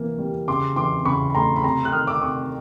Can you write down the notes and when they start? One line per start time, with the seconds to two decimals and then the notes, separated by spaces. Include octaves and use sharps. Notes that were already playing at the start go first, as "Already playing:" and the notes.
Already playing: C3 E3 A#3
0.19 G3
0.48 C#3 C6 D6
0.76 E3 C6 D6
1.05 C#3 B5 C#6
1.30 B5
1.35 A3 A#5 C6
1.56 B5
1.64 C3 A#5 C6
1.85 F#6
1.92 D#3 D#6 F6
2.07 D6 E6
2.21 C3 C#6 D#6